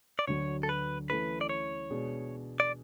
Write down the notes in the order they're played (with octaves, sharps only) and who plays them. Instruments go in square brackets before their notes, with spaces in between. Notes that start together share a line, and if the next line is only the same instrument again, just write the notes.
[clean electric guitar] D5
[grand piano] D2 D3 F#3 [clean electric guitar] C#5
[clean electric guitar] A4
B4
[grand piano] E3 A3 C#4 E4 A4 [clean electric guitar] B4
[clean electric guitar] D5
C#5
[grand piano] B2 G#3 D4 G#4
[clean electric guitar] D5